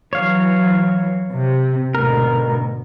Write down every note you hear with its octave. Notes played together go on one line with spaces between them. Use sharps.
E3 F#3 C#5 F5
C3
D2 G#2 B2 A#4